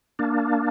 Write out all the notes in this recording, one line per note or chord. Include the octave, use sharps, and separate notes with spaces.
A#3 D4